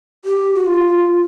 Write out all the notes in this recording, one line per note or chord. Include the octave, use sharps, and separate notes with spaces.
G4
F#4
F4